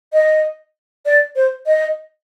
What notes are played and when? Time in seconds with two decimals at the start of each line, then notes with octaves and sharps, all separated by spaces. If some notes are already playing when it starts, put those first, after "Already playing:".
0.13 D#5
1.05 D5
1.36 C5
1.66 D#5